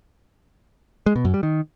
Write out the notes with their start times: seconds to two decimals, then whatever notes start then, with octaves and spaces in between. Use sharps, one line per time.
1.06 G#3
1.16 B2
1.25 F#2
1.34 G3
1.43 D#3